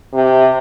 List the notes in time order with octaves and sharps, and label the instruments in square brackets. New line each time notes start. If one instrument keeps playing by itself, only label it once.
[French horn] C3